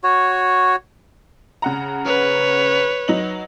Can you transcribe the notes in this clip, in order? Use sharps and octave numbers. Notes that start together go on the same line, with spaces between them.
F#4 C#5
C#3 F#5 A#5
B4 C#5
F#3 D#4 F#7